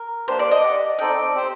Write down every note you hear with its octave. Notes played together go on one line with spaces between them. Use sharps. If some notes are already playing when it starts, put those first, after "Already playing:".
Already playing: A#4
A#3 D4 G4 C5
D5
D#5
G4 D5 F#5
C4 D#4 A4 D5 D#5 G5
C4 G4 C5 G5